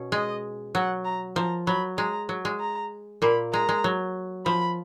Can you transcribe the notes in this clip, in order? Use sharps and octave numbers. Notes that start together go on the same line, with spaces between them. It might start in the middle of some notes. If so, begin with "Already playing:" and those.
Already playing: B2 C#4
G#3 D#5
F#3 F#5
A#5
F3 A#5
F#3 B5
G#3 A#5
F#3
G#3
A#5
A#2 A#3 B5
G#3 A#5
G#3
F#3
F3 B5